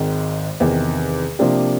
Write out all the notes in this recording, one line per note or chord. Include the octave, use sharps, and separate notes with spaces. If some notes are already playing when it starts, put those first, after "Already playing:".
Already playing: G#1 G#2 D#3 G#3
E2 C3 D#3
C3 F3 A#3 D4 G4